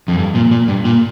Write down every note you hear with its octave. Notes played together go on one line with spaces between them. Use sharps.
F2
G2
A#2
A#2
G2
A#2